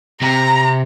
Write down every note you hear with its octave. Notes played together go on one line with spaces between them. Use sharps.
C3 A#5